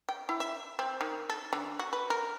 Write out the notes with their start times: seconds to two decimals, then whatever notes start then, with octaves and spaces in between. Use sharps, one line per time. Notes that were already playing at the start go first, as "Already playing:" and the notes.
0.09 G5
0.29 E4
0.40 E5
0.79 C4
1.01 D#3
1.30 A4
1.53 D3
1.79 F#4
1.93 B4
2.10 A#4